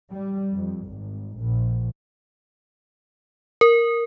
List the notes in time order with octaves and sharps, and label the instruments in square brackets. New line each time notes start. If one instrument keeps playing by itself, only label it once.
[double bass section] G3
F2
G#1
A#1
[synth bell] A#4